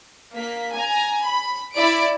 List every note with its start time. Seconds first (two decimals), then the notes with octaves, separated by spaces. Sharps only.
0.34 A#3 B6
0.73 G#5 A#5
1.23 B5
1.73 E4 D5 D7